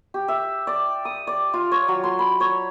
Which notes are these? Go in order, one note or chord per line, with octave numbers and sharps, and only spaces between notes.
G4
E5
D5
D#6
D5
F4
C#5
F#3
C6
B5
C#5